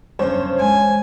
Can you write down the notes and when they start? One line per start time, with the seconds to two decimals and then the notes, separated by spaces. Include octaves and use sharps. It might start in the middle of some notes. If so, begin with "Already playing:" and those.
0.19 F#1 E2 G2 C#4 C5 C#5
0.60 E3 G#3 G#5